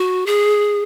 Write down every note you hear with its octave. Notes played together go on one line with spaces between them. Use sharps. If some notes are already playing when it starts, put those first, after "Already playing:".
Already playing: F#4
G#4